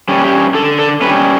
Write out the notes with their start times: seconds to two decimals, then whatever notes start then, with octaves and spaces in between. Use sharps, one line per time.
0.08 G3 C#4
0.24 G4
0.54 D3 A4
0.79 A4
1.01 G3 C#4 B4